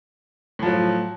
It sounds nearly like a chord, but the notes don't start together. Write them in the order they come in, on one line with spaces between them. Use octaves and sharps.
A2 F3 F#3